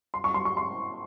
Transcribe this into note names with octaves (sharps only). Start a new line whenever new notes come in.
C6
C#6
C6
C#6
C6